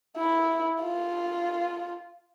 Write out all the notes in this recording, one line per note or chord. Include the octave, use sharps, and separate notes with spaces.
E4
F4